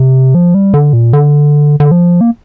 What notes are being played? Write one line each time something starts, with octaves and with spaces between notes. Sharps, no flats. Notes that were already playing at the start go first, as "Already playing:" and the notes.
Already playing: C3
F3
G3
D3
A#2
D3
D3
F3
A#3